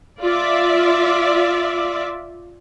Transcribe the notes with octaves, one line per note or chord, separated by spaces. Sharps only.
F4 D5 E5